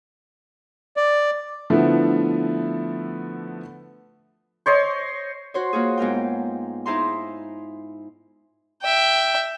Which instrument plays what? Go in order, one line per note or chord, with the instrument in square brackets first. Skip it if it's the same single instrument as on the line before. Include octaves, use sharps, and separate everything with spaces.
[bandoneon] D5
[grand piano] D3 F3 A3 B3 E4
[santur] C5 C#5 D#5 C6
[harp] F#4 C5 C#5
A#3 F4 F#4 G#4
G#2 B3 A#4 G5
D#4 E4 G#4 C5 A#5 C6
[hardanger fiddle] E5 G5